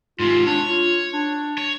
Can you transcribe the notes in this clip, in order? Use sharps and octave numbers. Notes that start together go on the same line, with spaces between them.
G#2 C3 F4
D4 C#5
F4
D4
C#5